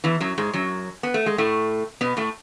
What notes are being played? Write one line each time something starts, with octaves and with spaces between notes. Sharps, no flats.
E2 E3
F#2 F#3
G#2 G#3
F#2 F#3
B3
A3
G#3
A2 A3
B2 B3
A2 A3